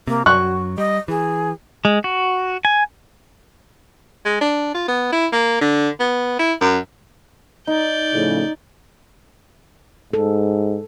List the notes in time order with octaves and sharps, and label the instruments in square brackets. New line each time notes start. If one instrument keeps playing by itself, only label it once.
[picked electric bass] C3 [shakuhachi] A#3
[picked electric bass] F#2 F#3 [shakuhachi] F#4 [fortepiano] C#6 F#6
[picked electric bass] G3 [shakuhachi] D#5
[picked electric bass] E3 [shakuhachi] G#4
[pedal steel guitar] G#3
F#4
G#5
[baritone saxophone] G#3
D4
F4
B3
E4
A#3
D3
B3
E4
F#2
[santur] D#4 [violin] D5 G6
[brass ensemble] A2 C#3 F3
[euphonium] G#2 [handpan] A4